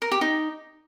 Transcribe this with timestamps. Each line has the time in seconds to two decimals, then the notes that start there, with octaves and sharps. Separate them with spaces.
0.02 A#4
0.11 G4
0.21 D#4